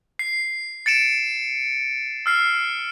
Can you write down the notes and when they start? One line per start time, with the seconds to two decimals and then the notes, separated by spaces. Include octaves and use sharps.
0.19 C7
0.86 A6 C#7 D7 E7
2.26 E6 F6 C7